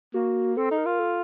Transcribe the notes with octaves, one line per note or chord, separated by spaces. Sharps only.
A#3 F#4
C4 A4
D#4
A#4
F4
A4